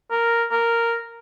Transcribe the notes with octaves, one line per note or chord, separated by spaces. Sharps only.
A#4
A#4